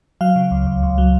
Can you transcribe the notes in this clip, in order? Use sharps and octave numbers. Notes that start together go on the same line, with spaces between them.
F#3 F5
C#3
C#2
C#2
C#2
F#3